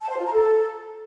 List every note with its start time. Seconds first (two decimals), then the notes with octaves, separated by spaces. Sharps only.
0.02 A5
0.09 C5
0.17 F4
0.25 A#5
0.33 A4